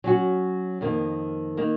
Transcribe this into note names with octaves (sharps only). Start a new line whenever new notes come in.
F#3 C#4 F#4
F2 D#3 A#3
D#3 A#3 D#4